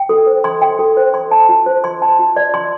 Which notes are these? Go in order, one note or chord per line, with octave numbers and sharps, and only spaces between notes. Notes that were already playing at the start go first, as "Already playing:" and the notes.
Already playing: G5
A4
C5
C6
G5
A4
C5
C6
A5
F4
C5
C6
A5
F4
D5
C6